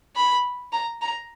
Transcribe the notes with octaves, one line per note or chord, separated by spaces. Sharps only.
B5
A#5
A#5